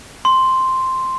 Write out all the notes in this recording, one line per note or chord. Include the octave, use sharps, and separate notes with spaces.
C6